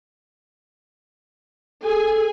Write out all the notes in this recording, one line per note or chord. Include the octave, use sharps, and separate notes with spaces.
G#4 A4 G#5